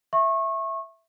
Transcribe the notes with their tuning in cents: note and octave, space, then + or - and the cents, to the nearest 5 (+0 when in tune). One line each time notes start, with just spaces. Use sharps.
E5 +0 C#6 -25